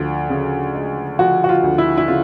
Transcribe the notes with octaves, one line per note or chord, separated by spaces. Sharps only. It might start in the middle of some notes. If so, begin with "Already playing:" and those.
Already playing: D2 F3
C#3
G#3
F3 F#4
F#4
F4
D2
E4
E4
C#3 F4